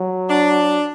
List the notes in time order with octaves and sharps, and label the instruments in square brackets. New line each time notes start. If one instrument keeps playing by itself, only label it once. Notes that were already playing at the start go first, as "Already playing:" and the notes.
Already playing: [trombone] F#3
[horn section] D4